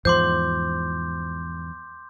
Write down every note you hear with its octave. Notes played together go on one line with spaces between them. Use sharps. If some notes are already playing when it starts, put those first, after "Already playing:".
E2 G#2 F3 C5 C6 D6 G6